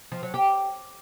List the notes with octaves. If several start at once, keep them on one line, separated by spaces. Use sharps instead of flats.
F3
F#3
G4